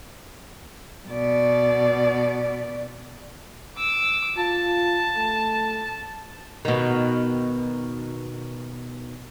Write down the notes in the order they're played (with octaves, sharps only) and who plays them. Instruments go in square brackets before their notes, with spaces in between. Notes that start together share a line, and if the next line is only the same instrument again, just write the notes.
[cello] B2 D5
[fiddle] D6 E6
[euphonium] F4 [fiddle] A5
[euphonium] A3
[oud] B2 D#3